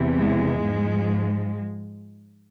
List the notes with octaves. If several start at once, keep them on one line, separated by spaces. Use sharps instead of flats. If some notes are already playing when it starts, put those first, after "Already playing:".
Already playing: E2 C3 E3
G#3
G#2 F3